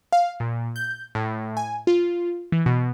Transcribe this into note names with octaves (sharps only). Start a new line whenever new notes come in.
F5
A#2
G6
A2
G#5
F4
E3
B2